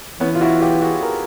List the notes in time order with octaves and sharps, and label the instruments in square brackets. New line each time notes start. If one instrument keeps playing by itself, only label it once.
[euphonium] E3 [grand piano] B3 C#4
[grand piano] F4
E4 F#4
F4 G4
F#4 G#4
G#4 A#4